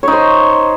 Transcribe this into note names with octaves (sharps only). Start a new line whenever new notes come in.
D#4 C5 C#5